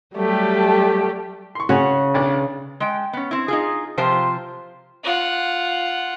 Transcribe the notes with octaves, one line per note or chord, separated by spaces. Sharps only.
F#3 G3 A3 G4
C6 C#6
C#3 F#4 F#5 G#5
B1 D4
G#3 G5
B3 C#4
C4 E4
D#4 F4 G#4
C3 F3 F4 G4 C5
F4 F#5